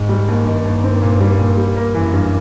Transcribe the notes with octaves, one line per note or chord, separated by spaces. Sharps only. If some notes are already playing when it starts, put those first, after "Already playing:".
Already playing: G#2
G3
D#2
G2 D#3
D#2
C4
A#2
G3
A#2
G3
A#3
F#2 E3
G2